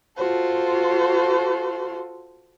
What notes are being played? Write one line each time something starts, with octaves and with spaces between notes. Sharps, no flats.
F4 F#4 A4 C5